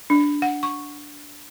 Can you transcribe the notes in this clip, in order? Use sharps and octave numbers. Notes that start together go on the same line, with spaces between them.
D4
F#5
C#6